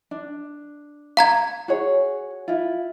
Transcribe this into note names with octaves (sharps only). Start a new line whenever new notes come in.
D4
F5 A#5 G#6
F#4 G#4 C#5
E4 F4